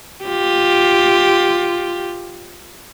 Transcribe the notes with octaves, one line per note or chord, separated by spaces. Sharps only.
F4 G4